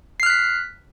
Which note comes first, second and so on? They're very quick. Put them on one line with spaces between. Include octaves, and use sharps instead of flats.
C7 F6 F#6 B6